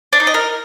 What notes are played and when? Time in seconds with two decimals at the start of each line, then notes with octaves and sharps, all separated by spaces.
0.13 D4
0.20 D#4
0.27 D#5
0.34 A#4